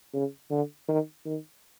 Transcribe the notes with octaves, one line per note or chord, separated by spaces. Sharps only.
C#3
D3
D#3
D#3